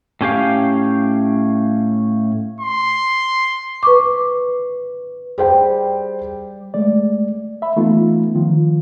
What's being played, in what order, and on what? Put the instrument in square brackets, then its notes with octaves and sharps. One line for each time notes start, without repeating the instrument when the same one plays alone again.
[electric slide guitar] A2 C#4 G4 F5
[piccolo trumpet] C6
[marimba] B4 C#6 D6
[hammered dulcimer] G3 [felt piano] G#4 C5 G5
[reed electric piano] G#3 A3 D5
E5 B5
E3 A3 B3 D#4 F4
D#3 F3 F4